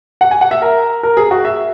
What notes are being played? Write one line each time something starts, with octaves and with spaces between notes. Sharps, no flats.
F#5
G#5
F#5
E5
A#4
A#4
G#4
F#4
E5